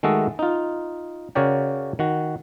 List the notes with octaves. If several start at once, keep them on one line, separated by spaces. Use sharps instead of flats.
D#3 G#3 A3 F#4 A4 D#5
D#4 F4
C#3 F#4 A#4 C#5 D5 G5
D#3 F#4